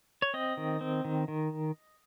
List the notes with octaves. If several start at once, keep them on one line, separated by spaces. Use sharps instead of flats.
C#5
C4 D#5
D#3
C4
D#3
D#3